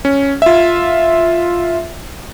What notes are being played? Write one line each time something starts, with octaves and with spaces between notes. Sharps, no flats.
C#4
F4 E5